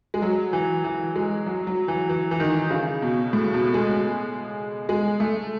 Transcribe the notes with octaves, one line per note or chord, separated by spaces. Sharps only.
G#3
F#3
E3
E3
G#3
F#3
F#3
E3
E3
E3
D#3
C#3
B2
A2
B2
G#3
G#3
A3